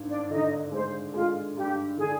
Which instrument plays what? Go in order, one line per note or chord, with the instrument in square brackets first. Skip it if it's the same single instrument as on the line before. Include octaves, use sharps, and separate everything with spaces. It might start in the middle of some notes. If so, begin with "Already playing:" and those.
Already playing: [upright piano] G#1 G2
[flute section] D4 D5
[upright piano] D3 [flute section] D#4 D#5
[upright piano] G#3 [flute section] C5
[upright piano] G#3 [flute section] F4
[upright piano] G2 [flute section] G4
[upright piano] D3 [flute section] G#4